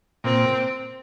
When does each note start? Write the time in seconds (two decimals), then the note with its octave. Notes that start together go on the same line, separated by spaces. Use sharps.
0.24 A#2 C4